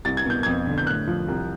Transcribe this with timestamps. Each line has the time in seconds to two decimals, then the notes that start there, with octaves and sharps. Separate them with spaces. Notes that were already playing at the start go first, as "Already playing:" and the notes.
0.05 C2 A6
0.17 G#6
0.26 B2 G6
0.43 F2 G#6
0.67 D3
0.78 G6
0.87 A2 F#6
1.07 F3
1.28 C2